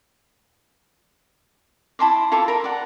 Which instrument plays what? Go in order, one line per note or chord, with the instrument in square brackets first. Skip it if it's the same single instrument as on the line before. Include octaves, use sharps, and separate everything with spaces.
[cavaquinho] E4 A5 C6 D6
F4 A4 E5 D6
A#4 B5
D5 F#5